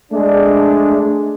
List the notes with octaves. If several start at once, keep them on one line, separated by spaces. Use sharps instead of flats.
G#3 A3 D4